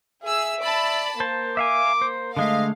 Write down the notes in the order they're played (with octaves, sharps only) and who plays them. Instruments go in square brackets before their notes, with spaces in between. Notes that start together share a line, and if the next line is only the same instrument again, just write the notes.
[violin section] G#4 E6 [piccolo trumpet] E5
[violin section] D5 A5 B5
[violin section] A#3 [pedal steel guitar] C5 A5
[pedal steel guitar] E5 F5 G#5 [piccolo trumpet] D6
[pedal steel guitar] C5
[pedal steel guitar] D3 G#3 A3 [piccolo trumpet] D#5 [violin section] F5